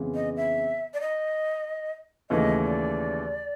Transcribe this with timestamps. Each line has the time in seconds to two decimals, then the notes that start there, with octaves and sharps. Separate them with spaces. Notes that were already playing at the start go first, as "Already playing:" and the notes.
Already playing: F2 C#3 E3 G#3 B3
0.15 D#5
0.36 E5
0.94 D5
1.01 D#5
2.30 D#2 C#3 E3 A3 D#5
2.63 D5